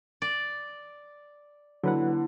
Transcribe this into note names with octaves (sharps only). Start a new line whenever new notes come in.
D5
D3 F#3 A#3 E4 B4 F#5